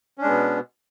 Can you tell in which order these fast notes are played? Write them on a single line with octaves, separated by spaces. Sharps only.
C#4 D4 G#3 B3 B2